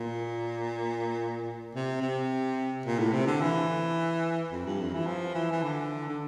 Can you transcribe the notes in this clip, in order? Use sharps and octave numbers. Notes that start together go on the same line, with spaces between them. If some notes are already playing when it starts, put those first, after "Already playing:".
Already playing: A#2
C3
C3
A#2
A2
C3
D3
E3
F2
G2
F2
E3
F3
E3
E3
D3
D3